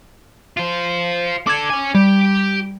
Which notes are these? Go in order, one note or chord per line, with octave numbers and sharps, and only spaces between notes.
F4 C5
D4 A4 D6 G#6
C#4 G#5
G3 G4